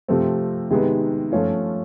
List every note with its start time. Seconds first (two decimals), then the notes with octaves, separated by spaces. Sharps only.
0.08 C3 F3 A3 C4
0.70 C3 D#3 G#3 B3 D#4
1.32 F3 A3 C#4 F4